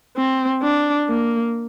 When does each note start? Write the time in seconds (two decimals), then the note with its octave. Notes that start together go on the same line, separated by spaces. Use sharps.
0.17 C4
0.63 D4
1.09 A#3